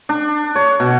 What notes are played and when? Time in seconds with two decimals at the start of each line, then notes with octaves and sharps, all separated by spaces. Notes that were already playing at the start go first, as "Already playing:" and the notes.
0.09 D4
0.56 C#5
0.80 B2